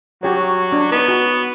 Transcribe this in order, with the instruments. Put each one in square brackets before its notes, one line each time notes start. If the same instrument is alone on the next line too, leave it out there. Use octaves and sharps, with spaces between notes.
[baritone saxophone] F#3 [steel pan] F#4 G4 C#5
[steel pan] D4
[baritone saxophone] B3 [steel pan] D#4
[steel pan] F#4